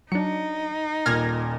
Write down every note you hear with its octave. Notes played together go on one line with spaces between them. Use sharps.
F#3 D4 D#4 C#7
D#1 A#2 F6 G#6 A#6